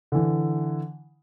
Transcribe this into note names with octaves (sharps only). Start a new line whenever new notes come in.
D3 E3